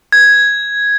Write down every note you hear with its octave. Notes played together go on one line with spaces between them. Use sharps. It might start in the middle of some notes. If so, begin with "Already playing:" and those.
G#6